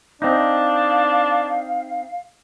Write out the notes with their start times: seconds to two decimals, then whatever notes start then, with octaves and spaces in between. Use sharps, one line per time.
0.22 C4 D4 D#4 F5